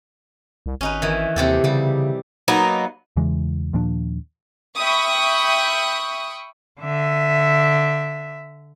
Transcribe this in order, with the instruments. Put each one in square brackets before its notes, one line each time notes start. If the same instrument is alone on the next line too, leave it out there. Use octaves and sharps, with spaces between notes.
[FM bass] C2
[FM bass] G#1 [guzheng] C#4 D#4 B4
[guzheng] D#3 E3
[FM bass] D#2 [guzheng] C3 G4 A4
[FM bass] C#3 [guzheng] G3 G4
[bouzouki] F#3 A#3 B3 D#4
[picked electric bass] E2 C#3 E3 G#3
D#2 A#2 F3 D4
[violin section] E5 G5 B5 C#6 D#6
[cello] D3 E5